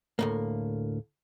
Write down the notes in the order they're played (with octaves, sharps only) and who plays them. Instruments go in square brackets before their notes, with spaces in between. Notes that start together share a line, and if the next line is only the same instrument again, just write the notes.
[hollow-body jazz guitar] D2 A2 A#3